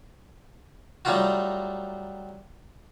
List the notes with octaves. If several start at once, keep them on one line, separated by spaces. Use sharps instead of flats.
F#3 G3 A3 D#4 F4 F#4